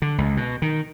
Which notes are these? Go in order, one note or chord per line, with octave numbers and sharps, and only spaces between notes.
D3
C#2
B2
D#3